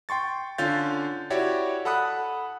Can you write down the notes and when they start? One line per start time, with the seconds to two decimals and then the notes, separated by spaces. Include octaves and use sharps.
0.09 G5 C6 C#6 A6
0.58 D3 C#4 F4 F5 G6 A6
1.30 E4 F#4 G4 C#5 D5
1.85 A4 F#5 B5 D#6 F#6